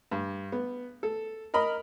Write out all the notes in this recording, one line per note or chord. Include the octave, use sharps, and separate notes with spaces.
G2
B3
A4
A#4 D#5 B5